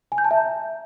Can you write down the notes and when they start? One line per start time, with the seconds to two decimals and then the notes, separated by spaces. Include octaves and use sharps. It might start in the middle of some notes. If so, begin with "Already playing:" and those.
0.12 G#5
0.18 G6
0.24 A5
0.31 E5
0.37 A#5